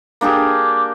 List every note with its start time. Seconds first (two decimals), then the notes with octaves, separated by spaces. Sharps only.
0.21 A#3 D4 G4 G#4